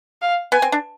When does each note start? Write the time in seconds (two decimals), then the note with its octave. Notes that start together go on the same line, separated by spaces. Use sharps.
0.22 F5
0.52 B3 G#5
0.62 C4
0.72 D4